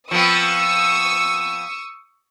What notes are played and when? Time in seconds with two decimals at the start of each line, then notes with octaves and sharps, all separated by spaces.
0.11 F3 B3 C4 C#6 D#6 E6